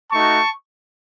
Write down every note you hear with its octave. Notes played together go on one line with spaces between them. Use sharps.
A3 D#4 F#4 A5 C#6